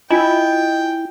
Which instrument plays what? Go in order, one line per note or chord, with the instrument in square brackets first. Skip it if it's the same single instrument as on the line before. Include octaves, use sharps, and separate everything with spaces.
[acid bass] E4 [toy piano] F4 [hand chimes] D#5 G#5 [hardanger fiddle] G5